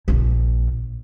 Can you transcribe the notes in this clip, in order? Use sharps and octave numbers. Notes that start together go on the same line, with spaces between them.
A#1 A#2